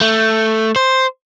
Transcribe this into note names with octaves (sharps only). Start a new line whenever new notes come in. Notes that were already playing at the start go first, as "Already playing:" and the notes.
A3
C5